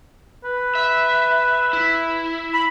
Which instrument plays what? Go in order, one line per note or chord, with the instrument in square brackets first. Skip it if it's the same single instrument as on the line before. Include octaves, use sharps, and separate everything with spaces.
[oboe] B4
[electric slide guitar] E5
E4
[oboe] B5